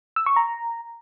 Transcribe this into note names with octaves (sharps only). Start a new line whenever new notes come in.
E6
C#6
A#5